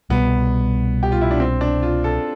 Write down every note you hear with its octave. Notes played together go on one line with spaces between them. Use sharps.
C2 B2 G3 B3
G4
F4
E4
D4
C4
D4
F4
A4